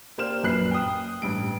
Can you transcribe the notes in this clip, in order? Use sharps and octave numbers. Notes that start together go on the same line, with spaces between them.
A#3 G4 C5 D5 F6 E7
A#1 F#2 B4 F#6 C7
G5 D#6
A1 G2 D7